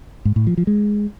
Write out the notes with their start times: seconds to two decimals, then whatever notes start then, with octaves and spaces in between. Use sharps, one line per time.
0.25 G#2
0.36 A2
0.47 F3
0.57 F3
0.67 G#3